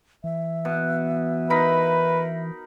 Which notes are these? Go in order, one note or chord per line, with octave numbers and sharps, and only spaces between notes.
E3 E5
B2
D#4 A#4 B4 B5